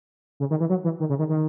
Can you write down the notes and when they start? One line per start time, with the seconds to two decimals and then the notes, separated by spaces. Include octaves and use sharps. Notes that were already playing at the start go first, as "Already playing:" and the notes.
0.40 C#3
0.50 D#3
0.60 E3
0.70 F#3
0.84 E3
1.00 D#3
1.09 C#3
1.19 D#3
1.29 D#3